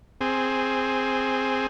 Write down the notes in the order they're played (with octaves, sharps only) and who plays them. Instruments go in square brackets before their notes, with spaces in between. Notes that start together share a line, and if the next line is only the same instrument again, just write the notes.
[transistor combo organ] C4 G#4